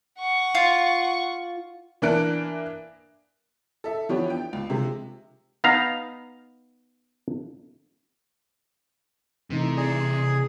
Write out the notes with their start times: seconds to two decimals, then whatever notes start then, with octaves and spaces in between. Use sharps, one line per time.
0.19 F#5 C#6
0.55 F4
2.02 E3 A#3 D4 F#6 D7
3.84 A4 E5
4.09 E3 F3 B3 D4 G4 C#5
4.30 G5
4.53 C#2
4.70 C3 F3 G#3
5.64 B3 D#4 F5 A#5
9.50 C3 E3 A3 D#4
9.77 G#4 D5